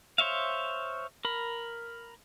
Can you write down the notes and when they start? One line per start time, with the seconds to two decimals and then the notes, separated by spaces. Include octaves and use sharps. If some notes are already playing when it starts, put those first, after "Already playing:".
0.18 C5 C#5 E5 F5
1.25 A#4 B5